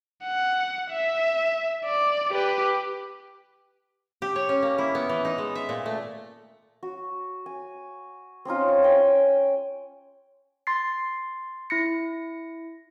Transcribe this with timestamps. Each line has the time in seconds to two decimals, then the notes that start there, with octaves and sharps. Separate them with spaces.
0.23 F#5
0.91 E5
1.84 D5
2.32 G4 B4
4.22 G4
4.36 C#5
4.49 C#4
4.62 A#3
4.78 E4
4.95 B3
5.09 E3
5.25 D#4
5.38 G#3
5.55 E5
5.69 A#2
5.86 A3
6.83 F#4
7.46 G#5
8.45 C4 C#4 D#4 F4
8.68 F5
8.83 C#5 E5 G5 G#5
10.67 C6 A6 C7
11.70 E4 A#6 C#7